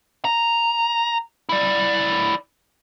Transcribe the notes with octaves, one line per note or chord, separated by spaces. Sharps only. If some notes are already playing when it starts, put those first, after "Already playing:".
A#5
E4 D5